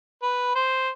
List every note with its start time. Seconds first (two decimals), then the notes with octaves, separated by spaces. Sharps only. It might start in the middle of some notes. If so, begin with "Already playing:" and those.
0.22 B4
0.55 C5